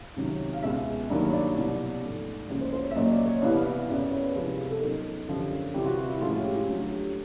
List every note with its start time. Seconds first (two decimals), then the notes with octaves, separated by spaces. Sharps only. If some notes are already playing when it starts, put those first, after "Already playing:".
Already playing: F5
0.17 C#2 C3 D#3 F#3
0.53 F5
0.63 C#2 B2 G#3 E5
1.10 G2 D#3 F#3 A#3
1.33 D5
1.56 C2 B2 F#3
2.03 G#2 F3 A3
2.49 C#2 C#3 F3 A#3 C#5
2.61 C5
2.67 C#5
2.73 C5
2.84 C#5
2.91 E5
2.95 A#2 F#3 A#3 C#4 D#5
3.12 D5
3.26 C#5
3.42 C2 C3 E3 G3 B3 F5
3.57 F5
3.66 E5
3.89 F#2 C#3 F#3 B3 D5
4.00 C#5
4.12 C#5
4.24 B4
4.35 C2 C3 F3 G#3
4.70 A4
4.81 C#3 F#3 B3 D#4 A#4
5.28 F#2 D3 F3 G4
5.74 C3 E3 G3 G4
5.82 F4
5.86 F#4
5.98 F4
6.09 E4
6.20 A2 F3 G#3 C#4 F4
6.32 F#4
6.44 G4
6.56 F4
6.68 D2 D3 F#3 F#4
6.91 G4